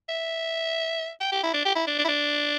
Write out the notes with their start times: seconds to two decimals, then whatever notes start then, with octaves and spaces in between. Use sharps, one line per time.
0.09 E5
1.20 G5
1.32 G4
1.43 E4
1.53 D4
1.65 G4
1.75 E4
1.87 D4
1.98 D4
2.04 E4
2.08 D4